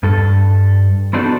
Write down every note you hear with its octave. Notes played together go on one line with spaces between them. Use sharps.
G2 A4
B3 C4 D4 D#4 F#4 A4